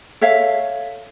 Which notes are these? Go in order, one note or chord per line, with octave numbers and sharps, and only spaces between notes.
A4 C#5 E5 F5